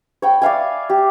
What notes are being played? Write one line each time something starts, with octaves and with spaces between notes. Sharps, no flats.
C#5 G5 B5
D5 E5 F5 G#5
G4